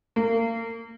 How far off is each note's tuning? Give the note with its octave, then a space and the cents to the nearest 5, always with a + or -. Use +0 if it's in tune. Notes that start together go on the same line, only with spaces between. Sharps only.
A#3 -30